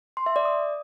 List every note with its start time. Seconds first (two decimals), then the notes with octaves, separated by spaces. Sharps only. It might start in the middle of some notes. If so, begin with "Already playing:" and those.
0.17 C6
0.26 E5
0.36 D5
0.45 D#6